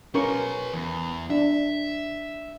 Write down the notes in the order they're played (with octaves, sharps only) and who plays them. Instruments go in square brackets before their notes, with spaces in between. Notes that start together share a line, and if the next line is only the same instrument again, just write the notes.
[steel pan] C#4 A#4 C#6 [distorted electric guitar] B4 C#5
[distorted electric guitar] E2
[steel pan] D4 [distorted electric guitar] E5